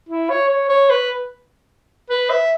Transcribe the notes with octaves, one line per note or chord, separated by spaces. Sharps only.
E4
C#5
C#5
C#5
B4
B4
E5